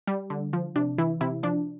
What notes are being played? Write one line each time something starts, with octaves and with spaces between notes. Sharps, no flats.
G3
D3
F3
C3 D4
E3 E4
C3 E4
F3 D4